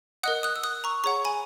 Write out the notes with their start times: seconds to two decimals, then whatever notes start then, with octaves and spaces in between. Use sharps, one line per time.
0.23 A#4 D#5 F#5 D#6 F#6
0.43 D#6 F#6
0.56 E6
0.64 D#6 F#6
0.84 A#5 C#6
1.04 G#4 C#5 F#5 A#5 C#6
1.25 G#5 B5